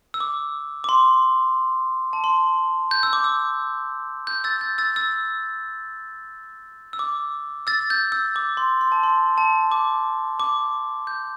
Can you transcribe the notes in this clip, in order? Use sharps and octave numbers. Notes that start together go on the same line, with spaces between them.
E6
D6
D6
C6
A5
C6
G6
E6
D6
E6
G6
E6 A6
G6
E6 A6
E6
E6
D6
E6 A6
G6
E6
D6
C6
C6
A5
C6
A5
D6
D6
G6